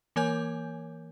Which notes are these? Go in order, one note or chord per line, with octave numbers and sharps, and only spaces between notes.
E3 A#3 A#4 C#5 G#5 G6